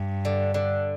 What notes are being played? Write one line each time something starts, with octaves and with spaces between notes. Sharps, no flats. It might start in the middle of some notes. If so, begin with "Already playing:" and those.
Already playing: G2
D3
D3